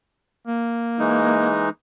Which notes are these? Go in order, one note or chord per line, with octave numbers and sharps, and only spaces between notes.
A#3
E3 G#3 D#4